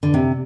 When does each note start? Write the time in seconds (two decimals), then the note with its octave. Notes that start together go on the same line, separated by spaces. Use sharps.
0.03 D3
0.14 C3